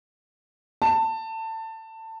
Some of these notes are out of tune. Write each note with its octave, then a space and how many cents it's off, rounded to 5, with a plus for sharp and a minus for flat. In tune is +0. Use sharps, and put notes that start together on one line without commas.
A5 +20